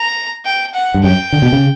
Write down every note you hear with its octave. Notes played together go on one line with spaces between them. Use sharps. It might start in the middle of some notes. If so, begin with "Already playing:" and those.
Already playing: A#5
G5
F#5
G2
F#2 G5
D3
B2
C#3